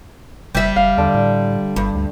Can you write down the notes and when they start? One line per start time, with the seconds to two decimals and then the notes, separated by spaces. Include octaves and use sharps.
0.55 F#1 G3 E5
0.76 F#1 F5
0.98 E2 D3
1.14 A2
1.76 G1 G2
1.95 D2